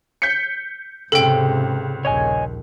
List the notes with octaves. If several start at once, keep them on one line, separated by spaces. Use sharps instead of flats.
G6 B6 C#7
C#2 G#2 C3 A4 G5
A#1 D#2 C#5 D#5 G#5